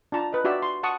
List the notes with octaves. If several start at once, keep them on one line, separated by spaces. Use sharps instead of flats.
D4 F4 A5 A#5
B4 D#5
D4 F#4 G4 D5 E5
C6
F#5 A5 C#6 D#6